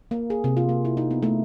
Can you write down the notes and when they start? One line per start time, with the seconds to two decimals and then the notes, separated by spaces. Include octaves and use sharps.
0.11 A#3
0.30 G#4
0.44 C3
0.57 F4
0.69 A#3
0.85 E4
0.97 D#4
1.11 B3
1.23 A3